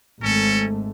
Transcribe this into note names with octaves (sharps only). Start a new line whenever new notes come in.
G#1 G#2 A3 C#4 A4